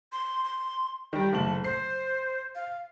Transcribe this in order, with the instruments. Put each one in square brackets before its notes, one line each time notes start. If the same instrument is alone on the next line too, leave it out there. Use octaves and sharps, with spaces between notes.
[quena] C6
C6
[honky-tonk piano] D#3 G3 [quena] G5
[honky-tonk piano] F#1 A3 F#7 [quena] A5
[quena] C5 [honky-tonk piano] C7
[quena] F5